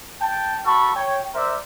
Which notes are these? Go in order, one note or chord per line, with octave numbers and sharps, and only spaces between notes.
G5 A5
F#4 A4 A5 B5 C#6
C#5 G5
A#4 C5 D5 E5